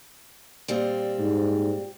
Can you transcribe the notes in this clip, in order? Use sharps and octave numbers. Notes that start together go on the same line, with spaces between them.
A#2 G3 C4
G#2